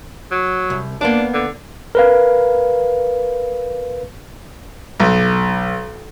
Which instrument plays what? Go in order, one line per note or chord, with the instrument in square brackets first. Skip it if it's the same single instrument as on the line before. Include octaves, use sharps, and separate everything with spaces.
[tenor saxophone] F#3
[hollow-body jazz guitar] C2
[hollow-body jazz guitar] A#3 B3 D5 [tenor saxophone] D4
[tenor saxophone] D3
[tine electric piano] A#4 B4 F5
[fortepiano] B1